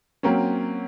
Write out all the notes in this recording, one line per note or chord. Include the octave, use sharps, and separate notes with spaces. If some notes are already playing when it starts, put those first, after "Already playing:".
F#3 A#3 C4 C#4